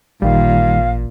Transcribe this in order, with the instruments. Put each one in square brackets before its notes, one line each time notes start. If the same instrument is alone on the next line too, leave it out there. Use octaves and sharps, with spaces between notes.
[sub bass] A1 [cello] A#2 [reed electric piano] D#3 G3 [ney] F5